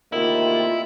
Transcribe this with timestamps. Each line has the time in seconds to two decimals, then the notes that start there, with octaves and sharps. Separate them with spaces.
0.12 D2 C3 D#3 A#3 E4 F4